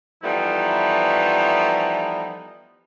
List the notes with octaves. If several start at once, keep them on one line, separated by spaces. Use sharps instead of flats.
E3 F3 G3 A3 B3 D#4